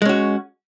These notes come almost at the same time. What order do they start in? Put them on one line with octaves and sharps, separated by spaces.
G#3 C#4 F#4